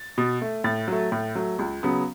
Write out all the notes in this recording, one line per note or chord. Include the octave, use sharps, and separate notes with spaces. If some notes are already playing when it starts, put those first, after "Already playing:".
Already playing: A6
B2
A3
A2 A6
F#3 A3
A2
F#3 A3
C#2
C#3 F#3 B3